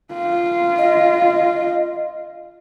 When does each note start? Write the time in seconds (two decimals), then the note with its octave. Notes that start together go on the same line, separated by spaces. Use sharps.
0.14 F4
0.78 D#5